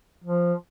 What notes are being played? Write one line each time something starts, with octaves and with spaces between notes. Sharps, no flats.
F3